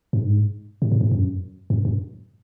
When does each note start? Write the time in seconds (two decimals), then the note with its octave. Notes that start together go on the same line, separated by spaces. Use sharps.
0.13 G2
0.22 G#2
0.82 A2
0.92 G#2
1.01 G2
1.11 F#2
1.70 F#2
1.85 F#2